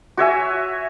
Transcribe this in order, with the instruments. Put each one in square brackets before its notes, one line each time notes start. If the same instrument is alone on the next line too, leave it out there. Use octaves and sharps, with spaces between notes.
[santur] F#4 C#5 E5 G#5